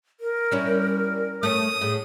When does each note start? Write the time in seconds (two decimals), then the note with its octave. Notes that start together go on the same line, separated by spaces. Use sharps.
0.20 A#4
0.51 G3 C#4 E4
1.43 A3 C#4 D#6
1.81 A2 G#4